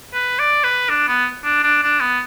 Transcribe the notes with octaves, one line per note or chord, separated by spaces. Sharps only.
B4
D5
B4
D4
B3
D4
D4
D4
B3